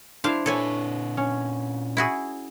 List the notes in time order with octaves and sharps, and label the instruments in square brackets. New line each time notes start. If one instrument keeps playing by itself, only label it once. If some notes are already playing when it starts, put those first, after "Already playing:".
[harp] D4 E4 [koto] C5 F5
[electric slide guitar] A#2 B4 [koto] A4 C#5 G#5
[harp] C#4
[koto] E4 F#4 G#4